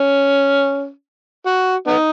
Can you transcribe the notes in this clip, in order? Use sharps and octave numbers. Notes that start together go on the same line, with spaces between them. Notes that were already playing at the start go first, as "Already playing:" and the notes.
Already playing: C#4
F#4
B3 D#4